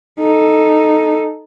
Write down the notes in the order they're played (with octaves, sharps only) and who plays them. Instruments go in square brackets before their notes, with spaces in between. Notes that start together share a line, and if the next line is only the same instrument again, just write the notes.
[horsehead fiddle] D#4 A4